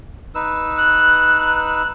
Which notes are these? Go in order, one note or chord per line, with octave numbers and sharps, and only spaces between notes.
D#4 B4 E6
F#6